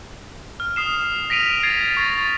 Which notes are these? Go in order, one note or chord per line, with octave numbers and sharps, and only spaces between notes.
F6
D#6 C7 E7
A#6 B6 D7 D#7 F7
G#6 A6 C7 D7
C#6 A6 A#6